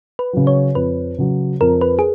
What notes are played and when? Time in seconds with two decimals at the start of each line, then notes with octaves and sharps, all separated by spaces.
0.19 B4
0.33 C#3 F#3
0.47 C#5
0.75 F2 B4
1.18 C#3 F#3
1.61 F2 A#4
1.81 B4
1.99 G#4